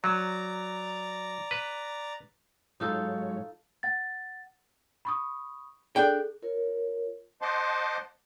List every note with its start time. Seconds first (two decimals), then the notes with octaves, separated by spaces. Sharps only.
0.04 F#3 D5 A#5
1.51 B4
2.80 G#2 F#3 D#4 F4 A4 C#5
3.83 F#5 A6
5.05 B5 C#6 D#6
5.96 D4 G#4 A4 G5
6.42 F4 A#4 C#5
7.42 C5 D#5 F#5 A5 C6 D6